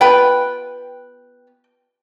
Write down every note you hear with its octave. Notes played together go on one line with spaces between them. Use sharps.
B3 F4 B4 G5